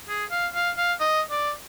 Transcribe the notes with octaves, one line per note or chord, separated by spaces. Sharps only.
G#4
F5
F5
F5
D#5
D5